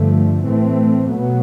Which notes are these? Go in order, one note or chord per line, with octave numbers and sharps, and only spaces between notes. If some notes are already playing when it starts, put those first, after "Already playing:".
Already playing: G2 D3 F3 A3
A2 E3 A3 C4
B2 F#3 B3